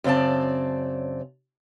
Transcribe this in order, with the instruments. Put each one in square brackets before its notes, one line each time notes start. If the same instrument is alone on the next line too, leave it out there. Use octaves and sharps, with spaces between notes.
[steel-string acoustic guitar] F#2 C#3 C4 D5 A5